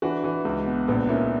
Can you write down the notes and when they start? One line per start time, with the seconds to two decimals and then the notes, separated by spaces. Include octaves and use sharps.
0.02 E3 D4 F#4
0.24 E3
0.45 C#2
0.66 B2
0.88 A#1 B3 D4
1.08 A#3 C#4 E4